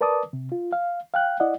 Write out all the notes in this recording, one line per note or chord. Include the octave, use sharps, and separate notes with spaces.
A#4 B4 D5 A5 D6 D#6
C3
F4
F5
F5 G5 F#6
E4 D5 D#5 F#5